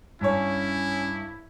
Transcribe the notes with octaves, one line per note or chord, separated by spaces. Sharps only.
G2 C#4 E4 C#5